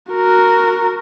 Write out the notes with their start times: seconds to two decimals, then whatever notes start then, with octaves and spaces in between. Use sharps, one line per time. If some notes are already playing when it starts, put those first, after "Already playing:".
0.12 F#4 A#4